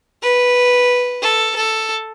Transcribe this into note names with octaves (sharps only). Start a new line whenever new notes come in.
B4
A4
A4